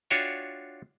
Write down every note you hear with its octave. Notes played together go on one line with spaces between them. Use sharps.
D4 F4 F#4 C#5 E5 G5